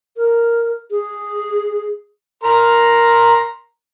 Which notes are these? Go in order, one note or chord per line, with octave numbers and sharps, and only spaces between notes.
A#4
G#4
A#4 A#5 C6